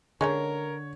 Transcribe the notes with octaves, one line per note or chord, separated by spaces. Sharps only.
D3 G#3 C#4 D#4 A#4 C#5